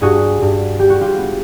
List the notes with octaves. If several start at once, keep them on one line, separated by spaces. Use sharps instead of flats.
G2 F#4 G#4
G2
G3 G4
F#4
F4 G4
B3